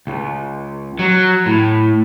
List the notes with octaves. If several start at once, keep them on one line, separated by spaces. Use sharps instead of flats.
C#2
F#3
A2